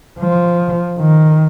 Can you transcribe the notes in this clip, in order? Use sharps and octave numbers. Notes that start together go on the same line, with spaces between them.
F3
D#3